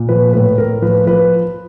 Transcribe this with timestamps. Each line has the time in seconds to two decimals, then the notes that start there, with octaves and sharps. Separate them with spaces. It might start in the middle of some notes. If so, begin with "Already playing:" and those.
Already playing: A#2
0.09 F3 B4
0.33 A2 B4
0.58 A2 A#4
0.82 F3 B4
1.06 F3 B4